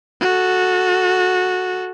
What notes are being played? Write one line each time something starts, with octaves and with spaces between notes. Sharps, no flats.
F#4 A4